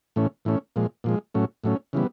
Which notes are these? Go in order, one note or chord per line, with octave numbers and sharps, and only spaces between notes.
A2 E3 A3 C#4
A2 E3 A3 C#4
A#2 F3 G#3
A#2 F3 G#3
A2 F#3 A3 C#4
A2 F#3 A3 C#4
C#3 E3 G3 B3